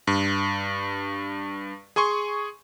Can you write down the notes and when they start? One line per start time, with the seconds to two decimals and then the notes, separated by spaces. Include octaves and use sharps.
0.07 G2
1.96 G#4 G#5 C6 C#6